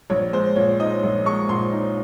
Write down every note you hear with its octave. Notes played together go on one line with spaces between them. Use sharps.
A#1 C#5
G#3 C5
A#2 C#5
D#4 D#5
A#1
G#3 C#6
A#2 C6
D#4